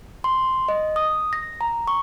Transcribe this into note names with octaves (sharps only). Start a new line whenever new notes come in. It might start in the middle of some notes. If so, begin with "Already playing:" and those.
C6
D#5
D#6
A#6
A#5
C#6